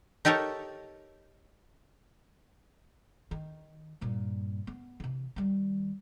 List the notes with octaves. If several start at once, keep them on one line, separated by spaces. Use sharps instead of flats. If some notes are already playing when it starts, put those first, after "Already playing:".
D#4 G4 A4 A#4 C#5
D#3
G2 A#2
B3
C3 E3
D#3 G3